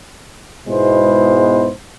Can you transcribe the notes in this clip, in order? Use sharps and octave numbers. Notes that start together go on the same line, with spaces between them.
G#2 B2 G#3 B3 E4 C5